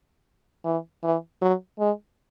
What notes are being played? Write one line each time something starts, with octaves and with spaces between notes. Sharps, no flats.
E3
E3
F#3
G#3